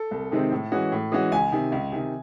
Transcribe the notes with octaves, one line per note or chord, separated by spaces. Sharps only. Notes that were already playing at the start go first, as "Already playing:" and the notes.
Already playing: A4
C2
C3 D#3 G#3 C4
A2
E3 G#3 C#4 F#4
A2
E3 G#3 C#4 F#4
C#2 G#5
C3 D#3
C#2
C3 D#3